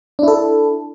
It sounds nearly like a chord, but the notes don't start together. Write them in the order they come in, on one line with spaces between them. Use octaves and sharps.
D4 E4 A4